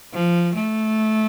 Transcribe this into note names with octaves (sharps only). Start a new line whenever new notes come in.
F3
A3